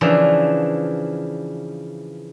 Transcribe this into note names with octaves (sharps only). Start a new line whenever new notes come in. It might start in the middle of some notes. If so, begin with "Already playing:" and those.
C#3 E3 F3 D4